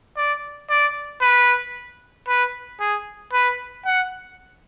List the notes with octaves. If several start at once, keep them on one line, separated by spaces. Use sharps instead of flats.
D5
D5
B4
B4
G#4
B4
F#5